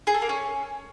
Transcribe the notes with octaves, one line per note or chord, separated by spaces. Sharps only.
G#4
A4
A#3
C#4